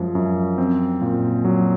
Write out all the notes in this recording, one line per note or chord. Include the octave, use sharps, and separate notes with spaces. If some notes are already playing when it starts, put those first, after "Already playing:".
Already playing: F#2 F3 G#3
F#2
C4
A#2
F#3